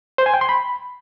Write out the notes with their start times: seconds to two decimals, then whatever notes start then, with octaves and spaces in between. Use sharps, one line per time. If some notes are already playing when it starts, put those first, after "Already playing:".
0.18 C5
0.26 G#5
0.34 G5
0.41 C6
0.49 B5